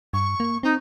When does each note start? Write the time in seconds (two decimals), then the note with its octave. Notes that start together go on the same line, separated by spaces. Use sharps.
0.13 G2 C#6
0.40 A#3
0.63 C4 D#4